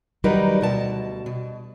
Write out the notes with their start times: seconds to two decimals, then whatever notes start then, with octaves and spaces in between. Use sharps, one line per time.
0.24 D#3 F#3 G3 D#4 A#4 B4
0.61 D2 B2 A5
1.26 B2